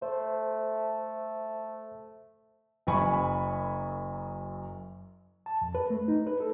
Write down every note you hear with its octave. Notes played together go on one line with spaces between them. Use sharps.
A3 C5
F#1 F#2 G#5 B5 C#6
A5
F2
B4
A3
D#4
B4
A4